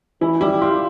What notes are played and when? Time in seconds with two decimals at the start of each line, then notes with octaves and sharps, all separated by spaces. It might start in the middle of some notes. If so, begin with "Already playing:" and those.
0.21 E3 E4
0.41 G3 E4
0.62 F4 G4